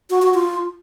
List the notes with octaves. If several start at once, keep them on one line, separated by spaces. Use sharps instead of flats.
F#4
F#4
F4